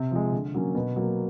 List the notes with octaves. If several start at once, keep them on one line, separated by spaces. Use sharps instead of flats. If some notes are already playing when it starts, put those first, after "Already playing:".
Already playing: C3
F3 G#3
D3
F#3 A#3 C#4
B2
F#3 A#3